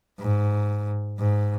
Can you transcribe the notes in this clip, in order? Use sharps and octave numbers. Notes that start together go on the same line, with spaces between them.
G#2
G#2